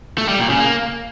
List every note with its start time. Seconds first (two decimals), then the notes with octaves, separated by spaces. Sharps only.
0.18 A3
0.29 G3
0.39 A#2
0.50 C#3
0.60 A#3